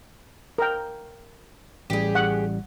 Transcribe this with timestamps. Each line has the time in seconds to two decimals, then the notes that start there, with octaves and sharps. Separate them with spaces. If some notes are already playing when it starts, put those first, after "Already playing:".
0.58 A#4 G5
1.90 A1 G3 G4 G#4
2.15 F#5